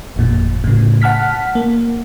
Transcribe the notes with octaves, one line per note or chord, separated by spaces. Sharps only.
G1 F2 A#2
A2 C#3
F#5 A5 F6 B6
A#3